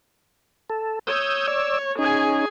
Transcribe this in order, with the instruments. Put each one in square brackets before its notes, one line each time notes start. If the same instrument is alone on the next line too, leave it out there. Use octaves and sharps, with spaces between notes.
[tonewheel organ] A4
[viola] C#5 [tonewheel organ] D#6 E6 G6
[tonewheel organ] D5 E6
[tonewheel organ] C#4 D#4 [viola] G#4 G#5